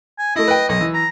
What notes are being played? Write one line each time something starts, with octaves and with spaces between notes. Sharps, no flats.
G#5
A3 E4 D#5
B4 G5
B1 D#5
E3
A#5